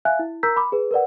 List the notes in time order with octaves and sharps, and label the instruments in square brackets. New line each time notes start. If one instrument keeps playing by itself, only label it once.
[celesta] E5 F5 G#5 F#6
E4
A#4 A#5 E6 G6 B6
B5 D6
G#4 B4
A#4 B4 D5 F#5